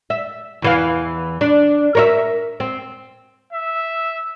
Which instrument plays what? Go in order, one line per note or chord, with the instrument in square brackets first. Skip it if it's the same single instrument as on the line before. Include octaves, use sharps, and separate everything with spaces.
[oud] E5
E2 E3 F5
D4
A#4 C#5 E5
C4
[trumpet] E5